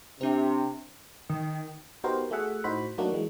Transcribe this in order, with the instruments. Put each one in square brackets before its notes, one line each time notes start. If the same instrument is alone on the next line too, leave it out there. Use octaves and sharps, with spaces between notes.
[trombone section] C3 [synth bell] D4 C5
[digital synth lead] D#3
[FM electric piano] B3 D#4 F#4 G4 A#4 C5
A3 F#4 G#4 E5 F#5
A2 D#4 F#4 C5 B5
F#3 A3 A#3 D4 D#4 F#4
E3 G#3